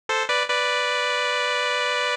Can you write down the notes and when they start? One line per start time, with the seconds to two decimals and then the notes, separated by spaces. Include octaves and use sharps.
0.09 A4 C5
0.29 B4 D5
0.50 B4 D5